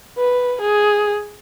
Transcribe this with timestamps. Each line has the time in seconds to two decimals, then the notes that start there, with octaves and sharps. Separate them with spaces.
0.18 B4
0.61 G#4